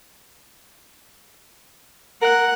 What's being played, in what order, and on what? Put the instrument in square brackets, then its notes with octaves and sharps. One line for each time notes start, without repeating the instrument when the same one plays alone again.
[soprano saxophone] A#4 [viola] F#5